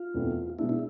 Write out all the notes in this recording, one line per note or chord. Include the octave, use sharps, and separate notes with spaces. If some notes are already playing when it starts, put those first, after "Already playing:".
Already playing: F4
E2 B2 A3 C4 E4
B2 G#3 B3 D4 E4
E4